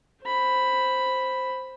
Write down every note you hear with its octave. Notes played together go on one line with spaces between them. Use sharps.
C5 B5